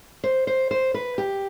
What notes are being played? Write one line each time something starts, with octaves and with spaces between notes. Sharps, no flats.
C5
C5
C5
B4
G4